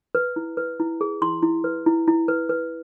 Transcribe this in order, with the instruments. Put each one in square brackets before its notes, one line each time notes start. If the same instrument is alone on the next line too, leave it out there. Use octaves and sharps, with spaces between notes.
[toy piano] B4
E4
B4
E4
G#4
E4 C6
E4
B4
E4
E4
B4
B4